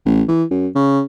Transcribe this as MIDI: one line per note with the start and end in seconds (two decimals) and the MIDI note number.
0.05 0.23 33
0.28 0.44 52
0.51 0.68 42
0.75 1.01 49